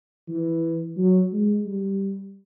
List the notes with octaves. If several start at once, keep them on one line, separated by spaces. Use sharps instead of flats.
E3
F#3
G#3
G3